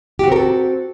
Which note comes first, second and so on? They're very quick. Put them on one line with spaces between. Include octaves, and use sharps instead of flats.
G4 F#4 C4 A#4 A4